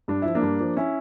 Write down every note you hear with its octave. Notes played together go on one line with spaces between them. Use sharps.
G2 D4
F3 E4
A#3 D4
G2
F3
C#4 E4